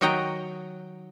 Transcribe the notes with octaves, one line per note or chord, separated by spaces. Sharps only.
D#3 F#3 F#4 D#5 G5 A#5